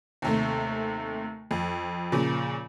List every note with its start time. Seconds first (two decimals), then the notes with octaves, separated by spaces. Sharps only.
0.22 D#2 C3 A3
1.51 F2
2.12 A#2 C#3 F3